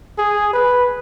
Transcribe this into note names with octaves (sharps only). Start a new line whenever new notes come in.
G#4
B4